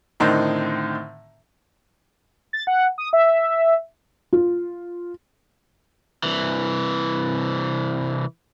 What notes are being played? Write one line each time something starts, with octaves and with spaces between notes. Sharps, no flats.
A2 D3 D#3 C4 D#4
A6
F#5
D#6
E5
F4
C2 E3